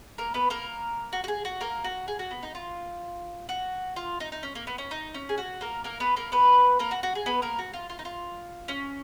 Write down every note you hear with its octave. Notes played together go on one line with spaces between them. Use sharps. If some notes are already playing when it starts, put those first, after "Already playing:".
A#3 A#4
B3 B4
A#3 A#4
F#4
F#4
G#4
F#4
A#3 A#4
F#4
G#4
F#4
B3
D#4
F4
F#4
F4
D#4
D#4
C#4
A#3
B3
C#4
D#4
C#4
G#4
F#4
A#3 A#4
A#3 A#4
B3 B4
A#3 A#4
B3 B4
A#3 A#4
F#4
F#4
G#4
B3 B4
A#3 A#4
F#4
F4
F4
D#4
F4
C#4